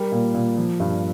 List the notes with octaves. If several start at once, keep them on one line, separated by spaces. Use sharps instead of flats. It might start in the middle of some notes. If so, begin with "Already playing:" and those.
Already playing: G3 A#4
A#2
A#2
F3
G2